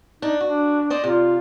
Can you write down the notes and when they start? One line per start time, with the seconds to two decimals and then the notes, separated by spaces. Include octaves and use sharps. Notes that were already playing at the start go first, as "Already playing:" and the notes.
0.22 D4 D#4
0.41 D4 F#4
0.90 C5 D5 D#5
1.04 C3 F4